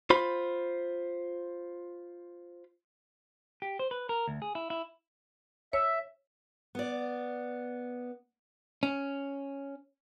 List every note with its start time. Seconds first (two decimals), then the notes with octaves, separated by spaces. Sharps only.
0.10 F4 C5 B5
3.62 G4
3.79 C5
3.91 B4
4.09 A#4
4.28 D2
4.42 G#4
4.55 E4
4.70 E4
5.73 C#5 E5
6.75 B3 D5
8.83 C#4